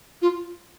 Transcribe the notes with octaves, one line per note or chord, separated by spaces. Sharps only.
F4